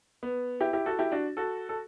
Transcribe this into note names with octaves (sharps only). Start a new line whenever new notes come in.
B3
E4 G4
E4 G4
F#4 A4
E4 G4
D4 F#4
F#4 A4
A4